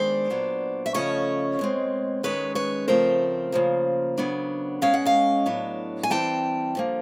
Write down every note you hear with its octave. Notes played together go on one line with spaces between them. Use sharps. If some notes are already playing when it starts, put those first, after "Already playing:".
Already playing: D#3 G#3 B3 D4 C5 D5
A#2 F#3 B3 D4
E5
C#3 F3 A3 C#4 C#5 D#5
B2 G#3 C4
D#3 G#3 C#4 B4 C#5
B4 C#5
C#3 F3 A3 C4 A#4 C5
C#3 F3 A#3
C#3 F#3 B3 D4
B2 G#3 C#4 F5
F#5
D#5 F5
A2 F#3 B3 D4
G#5
E3 G3 C4 G5 A5
D3 F3 A#3